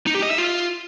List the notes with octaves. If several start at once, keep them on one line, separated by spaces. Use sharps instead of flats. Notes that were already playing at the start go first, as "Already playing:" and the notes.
D#4
G4
D#5
E5
F4